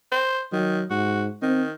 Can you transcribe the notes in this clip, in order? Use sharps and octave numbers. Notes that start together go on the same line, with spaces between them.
C5
D#3 F#3
G#2 F#4
D#3 C4